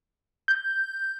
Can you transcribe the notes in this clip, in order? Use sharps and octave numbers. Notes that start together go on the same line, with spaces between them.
G6